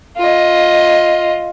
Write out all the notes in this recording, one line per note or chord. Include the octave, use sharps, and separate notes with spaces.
F4 D#5